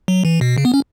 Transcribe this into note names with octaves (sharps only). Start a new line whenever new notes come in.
F#3
E3
B2
C#3
B3
C#4